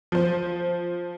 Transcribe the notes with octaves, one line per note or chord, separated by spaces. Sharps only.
F3 C5